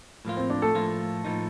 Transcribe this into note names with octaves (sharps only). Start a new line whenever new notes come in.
A2 F3 A#3 F4
C4
D4
A3 A4
A2 F3 A#3 F4
A2 F3 A#3 D#4